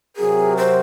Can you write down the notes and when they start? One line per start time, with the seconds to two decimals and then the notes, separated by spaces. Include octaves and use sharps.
0.16 C3 F#3 C4 F#4 G#4 A#4
0.57 C5